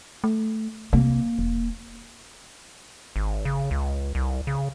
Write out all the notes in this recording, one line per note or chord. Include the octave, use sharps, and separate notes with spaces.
A3
C3 A#3
E1
G#1
C#3
C#2
C2
C#3